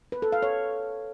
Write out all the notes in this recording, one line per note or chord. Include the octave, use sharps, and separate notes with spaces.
B4
A4
F5
C#5